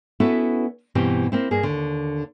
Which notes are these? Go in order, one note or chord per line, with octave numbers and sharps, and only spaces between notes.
B3 C#4 E4 F#4 A4 B4
G2 B2 E3 C4 G4
A#3 C4 E4
G2 A#3 G#4
D#2 D3